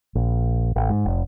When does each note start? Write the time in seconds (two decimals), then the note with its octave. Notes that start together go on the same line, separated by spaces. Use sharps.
0.15 A#1
0.76 A1
0.90 G#2
1.05 F1